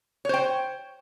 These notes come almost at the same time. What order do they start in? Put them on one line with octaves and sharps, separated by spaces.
C#5 C5 G5